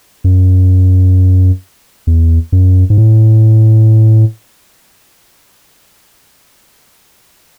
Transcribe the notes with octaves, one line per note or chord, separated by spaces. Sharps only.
F#2
E2
F#2
G#2
A2